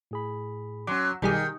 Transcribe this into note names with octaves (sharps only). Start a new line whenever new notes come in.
A2 G#4 B5
F#3 C#4 C6 D6
B1 D#3 G3 D#4 G#4